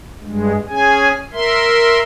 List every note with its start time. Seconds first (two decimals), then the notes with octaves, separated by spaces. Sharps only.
0.21 G2 G#3
0.69 C#4 G#4 G#5
1.33 A#4 E5 C6